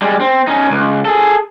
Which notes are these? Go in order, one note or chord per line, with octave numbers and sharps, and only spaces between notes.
G3 G#3
C4
C#4 D#4
C#2
G#4 A4